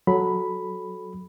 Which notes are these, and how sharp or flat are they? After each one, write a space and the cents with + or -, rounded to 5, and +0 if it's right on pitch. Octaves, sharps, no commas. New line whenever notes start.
F#3 -10 A4 -15 B5 +0